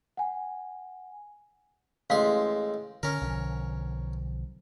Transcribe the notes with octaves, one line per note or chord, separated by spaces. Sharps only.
F#5 G#5
A1 G#3 F5 C6
D3 C#4 A#4
B1 D3 F3